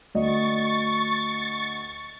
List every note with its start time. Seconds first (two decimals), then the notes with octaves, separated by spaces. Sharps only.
0.15 D2 D5 D#5 C#6 A6